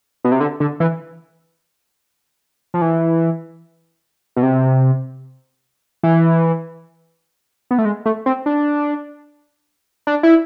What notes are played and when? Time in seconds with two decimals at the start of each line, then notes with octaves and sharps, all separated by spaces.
0.24 B2
0.32 C3
0.40 D3
0.60 D3
0.80 E3
2.74 F3
2.82 E3
4.36 B2
4.43 C3
6.03 E3
7.71 B3
7.78 A3
7.85 G#3
8.06 A3
8.26 C4
8.46 D4
10.07 D4
10.23 E4